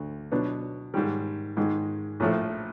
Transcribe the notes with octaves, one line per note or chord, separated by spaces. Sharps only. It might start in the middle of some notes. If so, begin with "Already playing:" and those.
Already playing: D2 D3
B2 F#3 B3 D4
G#2 D#3 G3
G#2 D#3 G#3
A#1 A2 F3 A3